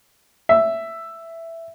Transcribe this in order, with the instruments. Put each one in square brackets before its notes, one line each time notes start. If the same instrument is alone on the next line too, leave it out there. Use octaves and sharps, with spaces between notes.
[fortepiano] E5